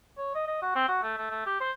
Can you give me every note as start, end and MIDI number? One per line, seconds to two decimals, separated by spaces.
0.18 0.33 73
0.35 0.46 75
0.47 0.60 75
0.62 0.75 66
0.76 0.87 60
0.88 1.02 66
1.03 1.16 57
1.18 1.26 57
1.30 1.42 57
1.46 1.57 67
1.60 1.71 72